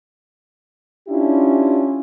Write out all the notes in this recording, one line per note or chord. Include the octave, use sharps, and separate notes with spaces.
C#4 D4 E4 F4 G4